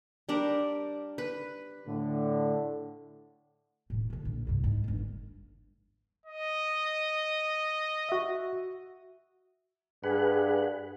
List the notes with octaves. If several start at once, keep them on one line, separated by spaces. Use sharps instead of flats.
G3 D4 A#4
B4
A2 D3
E1 A2
D3 F3
A#1
C2 G2
G#2
G1 F2
D#5
F#4 E5
G2 G#4 B4 F#5